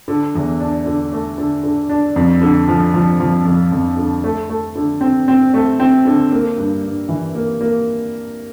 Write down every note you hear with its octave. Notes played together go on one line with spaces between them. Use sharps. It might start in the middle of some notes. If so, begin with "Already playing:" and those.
D3
E2
D4
D3
A3
D3
D3
D4
F2
D3
F3
F3
F3
F2
F2
D3
A3
A3
D3
C4
C4
A3
C4
D3
A#3
G2
G2
E3
A#3
A#3